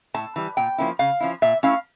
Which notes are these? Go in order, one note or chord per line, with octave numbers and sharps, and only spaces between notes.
A2 A5
E3 G3
A#2 G5
F3 A#3 C#4 E4
C#3 F5
F3 C#4 E4
A#2 E5
A3 C#4 E4 F5